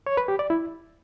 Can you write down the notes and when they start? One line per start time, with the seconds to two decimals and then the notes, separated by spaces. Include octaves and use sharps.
0.06 C#5
0.17 B4
0.28 G4
0.39 D5
0.50 E4